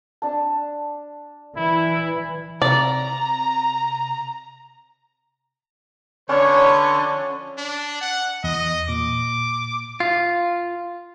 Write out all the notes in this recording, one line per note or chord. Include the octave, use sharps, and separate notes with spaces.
D4 A5
E3 E4
C3 D5 A#5
D3 C#4 B4 C#5 D5 A5
F3
D4
F#5
E2 D#5
A#2 D6
F4